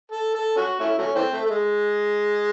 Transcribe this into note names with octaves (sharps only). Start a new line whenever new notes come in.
A4
A4
C#4 F#4
A3 C#4 E4
F#3 A3 C#4
E3 A3 C4
A3
A3
G#3